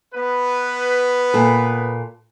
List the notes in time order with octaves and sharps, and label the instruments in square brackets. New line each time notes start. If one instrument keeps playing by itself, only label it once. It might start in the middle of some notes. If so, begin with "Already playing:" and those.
[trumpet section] B3 B4
[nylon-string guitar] A#2 A4